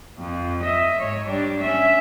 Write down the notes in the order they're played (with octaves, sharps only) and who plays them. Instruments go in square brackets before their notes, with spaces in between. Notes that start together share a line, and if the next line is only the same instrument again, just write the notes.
[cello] F2
D#5 E5
G#2 C#5
G3 D4
C#4 E5